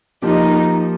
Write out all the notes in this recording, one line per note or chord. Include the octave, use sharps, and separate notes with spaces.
F3 A#3 D#4 G4